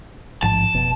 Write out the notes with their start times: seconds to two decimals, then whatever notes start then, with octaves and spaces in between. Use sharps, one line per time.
0.42 A1 G#2 F3 A5
0.74 F1 B2